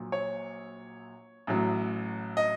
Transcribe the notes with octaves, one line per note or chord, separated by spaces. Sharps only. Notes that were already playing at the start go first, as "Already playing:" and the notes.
Already playing: A#1 A#2 F#3
C#5
A1 A2 F#3
D#5